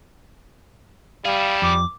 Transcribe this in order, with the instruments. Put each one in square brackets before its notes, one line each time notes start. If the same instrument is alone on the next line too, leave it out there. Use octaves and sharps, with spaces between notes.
[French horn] G3 [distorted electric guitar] E4 G#4 [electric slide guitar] F5
[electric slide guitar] F2 [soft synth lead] D6